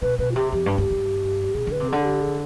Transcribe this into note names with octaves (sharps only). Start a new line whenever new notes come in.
B2 B4
B2 B4
F4
C3 G4
F2 G4
G2
G2
G2
B2 G#4
D3 B4
C3
G#4
D3
G#4
G4
G#4